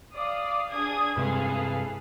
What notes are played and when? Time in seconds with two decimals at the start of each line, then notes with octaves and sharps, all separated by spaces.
0.15 D5 F5 D#6
0.70 D4 G#4 D#6 G#6
1.17 G2 C3 G#3 G#4 A4 B4 F5